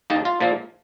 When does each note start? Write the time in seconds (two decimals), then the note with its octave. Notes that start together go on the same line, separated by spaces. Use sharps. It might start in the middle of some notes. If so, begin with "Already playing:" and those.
0.10 D#2 D#3 A#3 D#4
0.25 F4
0.40 A#2 F3 A#3